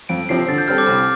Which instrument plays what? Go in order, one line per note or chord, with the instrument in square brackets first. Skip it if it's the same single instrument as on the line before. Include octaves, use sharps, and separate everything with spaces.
[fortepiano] F2 [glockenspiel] D7
[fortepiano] C3 F3 C4 [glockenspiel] C7
[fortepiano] D3 [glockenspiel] A6
[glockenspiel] G6
[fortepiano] G3 C4 A4 [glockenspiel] F6
[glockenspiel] D6
[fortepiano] C2 [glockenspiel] F6